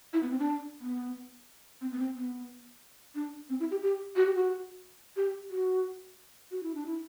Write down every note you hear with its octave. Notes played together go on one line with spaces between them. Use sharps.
E4
B3
C4
D4
B3
C4
B3
C4
B3
D4
C4
E4
G4
G4
F#4
G4
F#4
G4
F#4
F#4
E4
D4
E4